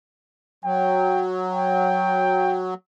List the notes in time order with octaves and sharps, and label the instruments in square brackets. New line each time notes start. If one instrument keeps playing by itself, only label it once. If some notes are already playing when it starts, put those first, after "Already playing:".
[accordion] F#3 [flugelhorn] G5
[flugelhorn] G5